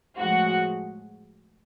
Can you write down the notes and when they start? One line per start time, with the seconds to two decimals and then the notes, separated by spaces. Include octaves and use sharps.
0.17 A2 F3 G#3 F#4 F#5